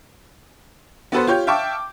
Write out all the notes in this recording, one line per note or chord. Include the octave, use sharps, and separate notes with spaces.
B3 F#4 A4 B4 C5
F4 G4 C#5 G6
E5 F5 G5 A5 C#6 D6